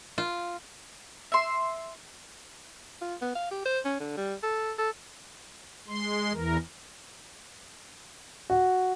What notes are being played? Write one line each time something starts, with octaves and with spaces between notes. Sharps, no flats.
F4
E5 C6
F4
B3
F5
G4
C5
C#4
D3
G3
A4
A4
G#3 C6
E2 E3 A#4
F#4